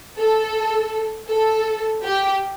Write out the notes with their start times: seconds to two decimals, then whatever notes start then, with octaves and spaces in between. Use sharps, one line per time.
0.17 A4
1.28 A4
2.03 G4